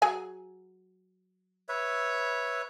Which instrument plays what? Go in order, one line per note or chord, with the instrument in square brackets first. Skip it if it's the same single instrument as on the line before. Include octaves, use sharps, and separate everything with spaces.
[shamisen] F#3 G#4 G#5
[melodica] B4 C#5 E5